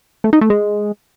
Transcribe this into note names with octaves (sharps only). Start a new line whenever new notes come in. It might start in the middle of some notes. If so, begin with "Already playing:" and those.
A3
D#4
A3
G#3